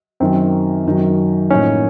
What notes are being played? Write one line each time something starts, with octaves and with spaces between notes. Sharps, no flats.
F#2 D#3 F#3 C4
F#2 D#3 F#3
A2 F3 A#3 C#4 D#4